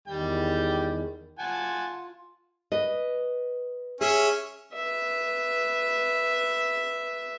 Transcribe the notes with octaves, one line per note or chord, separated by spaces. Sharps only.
E2 D#3 G3 G5
F4 F#5 G#5 A5
B4 D#5
C#4 G#4 E5
B4 E5